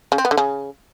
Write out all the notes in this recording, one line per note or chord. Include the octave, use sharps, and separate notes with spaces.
C#3
C4
B3
D3
C#3